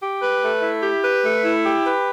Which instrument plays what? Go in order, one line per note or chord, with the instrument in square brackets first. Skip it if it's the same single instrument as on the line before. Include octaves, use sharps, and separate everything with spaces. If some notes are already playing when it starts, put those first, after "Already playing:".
[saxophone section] G4
B4
A3
E4
G4
B4
A3
E4
G4
B4